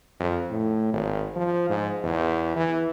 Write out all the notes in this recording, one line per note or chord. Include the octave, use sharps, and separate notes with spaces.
F2
A2
G#1
F3
G#2
E2
E3